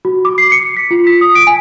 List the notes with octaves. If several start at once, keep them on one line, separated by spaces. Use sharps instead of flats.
F#4
D6
C7
C#7
B6
F4
B6
D#6
D7
G#5